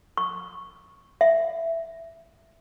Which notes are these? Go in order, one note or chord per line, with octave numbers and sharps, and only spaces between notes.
C#6
E5